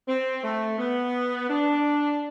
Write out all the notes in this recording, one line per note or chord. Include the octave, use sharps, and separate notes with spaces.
C4
A3
B3
D4